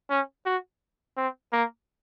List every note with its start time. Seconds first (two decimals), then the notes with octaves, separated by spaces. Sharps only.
0.10 C#4
0.46 F#4
1.17 C4
1.53 A#3